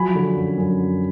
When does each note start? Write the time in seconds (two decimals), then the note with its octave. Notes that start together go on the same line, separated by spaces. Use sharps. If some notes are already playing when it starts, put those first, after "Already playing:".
Already playing: F3 F#3 G#5 B5
0.15 D3
0.36 F#2
0.58 F#2
0.79 F#3